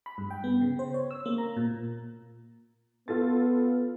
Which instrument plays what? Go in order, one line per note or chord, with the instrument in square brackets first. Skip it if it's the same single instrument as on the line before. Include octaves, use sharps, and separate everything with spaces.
[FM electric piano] B5
G2
G5
B3
C#3
C5
C#5
E6
A#3
A#5
A#2
[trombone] B3 [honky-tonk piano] F4 A4 A6